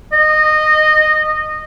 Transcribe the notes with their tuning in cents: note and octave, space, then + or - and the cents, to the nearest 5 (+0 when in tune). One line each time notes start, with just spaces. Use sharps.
D#5 -20